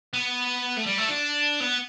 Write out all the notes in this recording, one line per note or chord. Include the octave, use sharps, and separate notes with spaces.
B3
A3
G3
A3
D4
B3